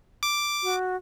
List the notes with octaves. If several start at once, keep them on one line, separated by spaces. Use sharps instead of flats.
D6
F#4